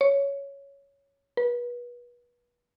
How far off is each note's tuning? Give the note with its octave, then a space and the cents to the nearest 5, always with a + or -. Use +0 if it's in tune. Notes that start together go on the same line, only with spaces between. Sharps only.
C#5 +5
B4 -30